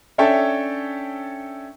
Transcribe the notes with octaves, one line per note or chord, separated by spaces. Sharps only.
C#4 D4 A4 C#5 E5 G5